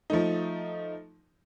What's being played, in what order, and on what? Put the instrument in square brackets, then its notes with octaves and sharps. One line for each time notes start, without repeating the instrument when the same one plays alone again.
[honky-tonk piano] F3 A3 D#4